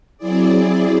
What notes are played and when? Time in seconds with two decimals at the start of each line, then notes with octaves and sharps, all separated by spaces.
0.18 F#3 C4 E4 G#4 D5